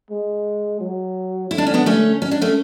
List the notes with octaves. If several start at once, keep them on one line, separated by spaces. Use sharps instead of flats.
G#3
F#3
D3 E4
D4
C#4
B3 D4
A3 C#4
C#4
D4
A3 C#4